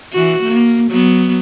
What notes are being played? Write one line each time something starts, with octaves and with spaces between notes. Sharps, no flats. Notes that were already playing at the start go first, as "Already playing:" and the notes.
E3 F#4
A#3
F#3 B3